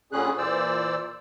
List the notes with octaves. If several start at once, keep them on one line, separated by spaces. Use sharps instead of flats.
A#2 D3 G3 C#4 G#4 F#6
A#2 E3 C5 D5 E6